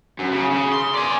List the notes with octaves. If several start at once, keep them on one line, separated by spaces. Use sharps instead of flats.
F#2
C#3
C#3
C6
D5 G#5